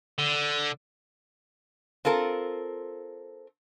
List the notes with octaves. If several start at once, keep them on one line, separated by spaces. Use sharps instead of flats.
D3
C4 F4 A4 A#4